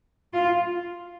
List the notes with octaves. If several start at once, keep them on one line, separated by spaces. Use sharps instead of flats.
F4